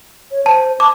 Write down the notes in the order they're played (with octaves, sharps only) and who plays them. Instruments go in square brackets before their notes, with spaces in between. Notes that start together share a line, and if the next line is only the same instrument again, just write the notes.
[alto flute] C#5
[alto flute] C5 [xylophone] A5
[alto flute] A5 [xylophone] D6